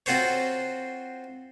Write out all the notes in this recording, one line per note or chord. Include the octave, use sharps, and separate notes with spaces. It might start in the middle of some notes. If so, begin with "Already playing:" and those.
C4 F4 F#4 A4 C5 C#5